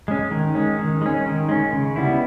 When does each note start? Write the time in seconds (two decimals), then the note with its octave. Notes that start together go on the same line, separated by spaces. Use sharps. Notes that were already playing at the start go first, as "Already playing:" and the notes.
0.08 G#3 C#4
0.31 D#3
0.55 G#3 C#4
0.79 D#3
1.01 G#3 C#4
1.26 D#3
1.49 G#3 C#4
1.73 C#3
1.96 G3 B3 E4